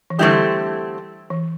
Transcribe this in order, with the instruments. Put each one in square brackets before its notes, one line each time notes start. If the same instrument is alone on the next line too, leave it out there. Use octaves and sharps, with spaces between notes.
[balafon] E3
[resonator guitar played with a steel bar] D3 A3 C4 E4 G4 [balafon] G3
[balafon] E3